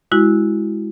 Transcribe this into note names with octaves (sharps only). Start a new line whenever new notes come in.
G#3 E4 F#4